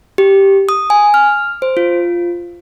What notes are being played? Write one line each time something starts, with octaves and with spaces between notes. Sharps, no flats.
G4
D#6
G#5
F6
C5
F4